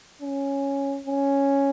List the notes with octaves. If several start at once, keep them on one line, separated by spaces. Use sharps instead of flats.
C#4
C#4